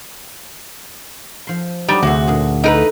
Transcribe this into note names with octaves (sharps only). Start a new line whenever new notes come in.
F3 C6
F#3 G3 D4 D#4
D2 C3 F#4 G#4 C#5
A#2 D4 G#4
A3 D#4 E4 A#4 B4